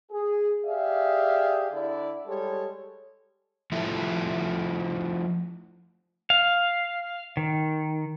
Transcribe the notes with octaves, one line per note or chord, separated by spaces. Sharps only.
G#4
G4 G#4 D5 E5 F5
D3 E4 D5
G3 G#3 G4 A4 C#5
F3 A3 E4
F5
D#3